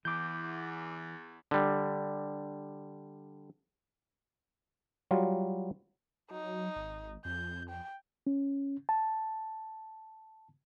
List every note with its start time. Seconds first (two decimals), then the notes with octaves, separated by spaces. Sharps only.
0.05 E2 E3 D6 G6
1.51 D3 G3
5.11 F#3 G3 F4 F5
6.31 F#3 D#4
6.76 G#1
7.25 F2 G6
7.70 G5
8.27 C#4
8.89 A5